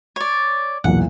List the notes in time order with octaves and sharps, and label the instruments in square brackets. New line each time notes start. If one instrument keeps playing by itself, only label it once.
[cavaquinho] C#5 D5
[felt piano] B1 E2 A#2 [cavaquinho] F#5